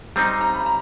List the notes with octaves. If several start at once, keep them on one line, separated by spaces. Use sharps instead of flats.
G3 C4 D#4 A#5
A#5
B5
A#5